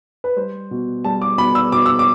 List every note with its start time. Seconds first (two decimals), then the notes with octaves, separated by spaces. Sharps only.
0.24 B4
0.36 G3 C5
0.71 B2
1.04 G3 A5
1.22 D6
1.38 B2 B5
1.55 E6
1.72 B2 D6
1.86 E6
1.99 D6